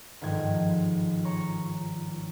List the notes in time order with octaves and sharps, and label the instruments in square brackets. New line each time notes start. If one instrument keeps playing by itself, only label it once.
[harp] G1 G#2 D#3 F3 G#3 G#6
C#5 A#5 C#6